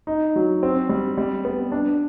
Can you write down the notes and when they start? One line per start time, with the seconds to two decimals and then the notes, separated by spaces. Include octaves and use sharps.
0.07 D#4
0.36 F#3
0.63 C4
0.89 G3
1.17 G3
1.45 B3
1.72 D4